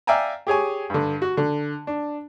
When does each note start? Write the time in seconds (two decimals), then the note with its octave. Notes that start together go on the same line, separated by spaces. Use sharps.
0.07 D5 E5 F5 G5 G#5 A#5
0.47 G4 G#4 C#5 G#5
0.90 G2 D3
1.22 F#4
1.37 D3
1.87 D4